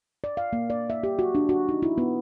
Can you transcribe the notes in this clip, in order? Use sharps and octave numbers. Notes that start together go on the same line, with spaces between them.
D5
F5
A#3
D5
E5
G4
F#4
D4
F#4
D#4
E4
B3